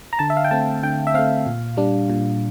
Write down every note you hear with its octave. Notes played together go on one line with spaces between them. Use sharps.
A#5
D3 A5
E5
F5
G5
A3 C4 A5
D3 G5
E5
A3 C4 F5
A#2
G3 D4
A#2